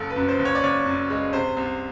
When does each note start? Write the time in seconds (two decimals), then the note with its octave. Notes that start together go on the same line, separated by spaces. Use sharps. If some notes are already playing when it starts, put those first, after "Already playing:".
Already playing: F#1 A4
0.10 B4
0.16 F#2
0.28 C5
0.39 F#1
0.45 C#5
0.55 D5
0.63 F#1 C#5
0.86 F#2
1.10 G#3
1.33 C3 C5
1.57 C2